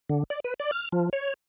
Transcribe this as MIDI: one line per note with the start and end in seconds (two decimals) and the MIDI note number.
0.09 0.23 50
0.30 0.40 74
0.44 0.54 71
0.60 0.71 74
0.72 0.89 89
0.92 1.09 53
1.13 1.34 73